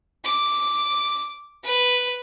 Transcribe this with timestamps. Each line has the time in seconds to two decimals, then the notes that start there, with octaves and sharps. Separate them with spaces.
0.25 D6
1.64 B4